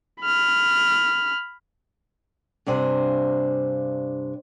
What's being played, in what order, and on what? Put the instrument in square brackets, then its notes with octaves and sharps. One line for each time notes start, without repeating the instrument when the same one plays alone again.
[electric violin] B5 F6
[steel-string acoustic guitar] G2 C3 D4 C5 G#5